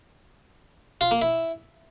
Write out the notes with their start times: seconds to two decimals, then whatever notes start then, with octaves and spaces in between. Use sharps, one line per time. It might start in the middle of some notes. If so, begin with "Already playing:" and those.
1.01 F4
1.11 A#3
1.22 E4